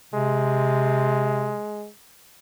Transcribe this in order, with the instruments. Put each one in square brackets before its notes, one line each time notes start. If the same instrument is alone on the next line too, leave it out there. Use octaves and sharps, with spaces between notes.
[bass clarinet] C3 [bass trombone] G#3